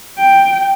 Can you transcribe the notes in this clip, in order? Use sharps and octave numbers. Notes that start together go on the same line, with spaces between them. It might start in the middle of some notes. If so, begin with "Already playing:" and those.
G5